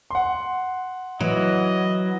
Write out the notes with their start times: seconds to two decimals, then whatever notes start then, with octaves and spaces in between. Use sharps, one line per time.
0.11 F#5 C6
1.21 E3 F#3 D#5